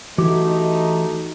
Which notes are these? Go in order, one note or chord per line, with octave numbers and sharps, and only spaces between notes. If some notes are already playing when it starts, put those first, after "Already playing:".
E3 A3 D#4 F#4 G4 D6